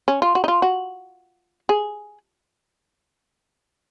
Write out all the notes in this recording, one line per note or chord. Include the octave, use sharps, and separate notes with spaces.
C#4
F4
F#4
D#4
F4
F#4
G#4